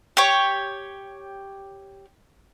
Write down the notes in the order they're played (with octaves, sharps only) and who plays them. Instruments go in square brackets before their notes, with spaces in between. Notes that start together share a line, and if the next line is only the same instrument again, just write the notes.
[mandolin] G4 C#5